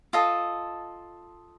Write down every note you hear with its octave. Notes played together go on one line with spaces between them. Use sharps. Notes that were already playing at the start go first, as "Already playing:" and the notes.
F4 A4 D#5 A5